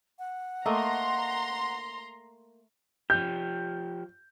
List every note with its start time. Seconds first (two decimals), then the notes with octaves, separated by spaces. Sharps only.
0.19 F#5
0.66 A3 A#3 D#5 A#5 C6
3.10 F3 G4 G6